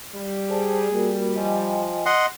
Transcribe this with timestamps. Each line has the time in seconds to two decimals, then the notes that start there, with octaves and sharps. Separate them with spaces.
0.14 G3
0.50 G#4 C5 D5 A5
0.92 G3 A#3 F#4 A#4
1.36 F3 D#5 G5 G#5
2.06 D#5 F#5 C6